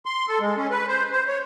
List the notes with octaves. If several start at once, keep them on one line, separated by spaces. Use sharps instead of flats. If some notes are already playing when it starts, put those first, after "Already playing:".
C6
A4
G#3
C#4
B4
C5
C5
C#5